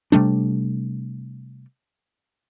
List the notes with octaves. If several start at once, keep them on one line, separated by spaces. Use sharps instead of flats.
C3 G3 A3 D4